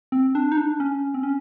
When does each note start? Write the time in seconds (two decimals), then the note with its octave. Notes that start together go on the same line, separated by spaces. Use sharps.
0.12 C4
0.35 D4
0.52 D#4
0.58 D4
0.80 C#4
1.14 C4
1.23 C#4